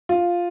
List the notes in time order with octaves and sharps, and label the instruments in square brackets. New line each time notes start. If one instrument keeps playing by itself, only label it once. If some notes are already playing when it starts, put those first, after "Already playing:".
[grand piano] F4